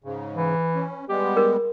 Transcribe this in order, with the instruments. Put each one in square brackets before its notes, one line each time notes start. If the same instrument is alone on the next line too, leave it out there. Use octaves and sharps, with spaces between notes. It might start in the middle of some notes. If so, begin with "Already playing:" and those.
[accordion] G#2 C#3
[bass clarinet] E3
[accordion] C#4
[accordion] G3 G#3 B3 [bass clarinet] G4
[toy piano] A#4